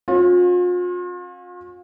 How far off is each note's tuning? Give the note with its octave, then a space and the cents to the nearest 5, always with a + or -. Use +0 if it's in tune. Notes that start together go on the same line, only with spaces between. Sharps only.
C#4 -40 F4 +40